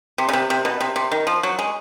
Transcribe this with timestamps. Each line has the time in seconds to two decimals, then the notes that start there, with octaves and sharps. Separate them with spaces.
0.18 C3
0.29 C#3
0.33 C3
0.50 C3
0.65 B2
0.81 C3
0.96 C3
1.12 D#3
1.27 F3
1.43 F#3
1.59 G#3